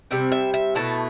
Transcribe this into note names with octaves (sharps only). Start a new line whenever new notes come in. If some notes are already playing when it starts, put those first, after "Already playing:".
C3 G3 C4 E5
E5
E5
B2 A3 E4 A5